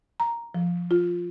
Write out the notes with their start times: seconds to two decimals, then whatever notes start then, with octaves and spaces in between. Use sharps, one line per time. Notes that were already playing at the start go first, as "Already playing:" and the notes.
0.20 A#5
0.55 F3
0.91 F4